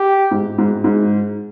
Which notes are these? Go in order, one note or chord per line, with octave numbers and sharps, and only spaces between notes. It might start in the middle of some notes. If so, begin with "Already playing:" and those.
Already playing: G4
G#2
G#2
G#2